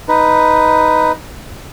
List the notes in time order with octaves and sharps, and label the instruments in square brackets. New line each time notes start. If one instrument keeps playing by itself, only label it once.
[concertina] D#4 B4